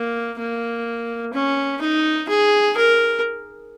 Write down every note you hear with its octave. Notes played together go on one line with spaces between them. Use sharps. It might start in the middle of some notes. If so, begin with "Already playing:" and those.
Already playing: A#3
A#3
C#4
D#4
G#4
A#4